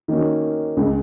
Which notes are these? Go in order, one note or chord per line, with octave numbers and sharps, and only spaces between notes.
D#3 A#3 C#4 F#4
C#2 C#3 G#3